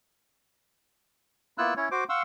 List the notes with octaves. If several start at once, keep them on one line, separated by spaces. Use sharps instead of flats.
A#3 B3 E4 F4 E6 F#6
C#4 E4 C#5
F#4 C5 D6
F5 F#5 C6 C#6 E6